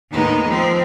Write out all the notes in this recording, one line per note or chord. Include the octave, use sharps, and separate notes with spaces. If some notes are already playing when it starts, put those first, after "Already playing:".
D#2 A2 D#3 G#3 B3 D#4
F3 C4